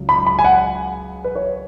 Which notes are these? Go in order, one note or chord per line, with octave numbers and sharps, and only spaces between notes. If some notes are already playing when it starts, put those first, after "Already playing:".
Already playing: C#2 C#3 F#3
B5
B5
G#5
F#5
B4
C#5